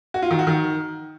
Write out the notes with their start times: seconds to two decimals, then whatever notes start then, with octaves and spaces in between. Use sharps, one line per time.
0.14 F#4
0.22 F4
0.31 D#3
0.39 F#4
0.47 D#3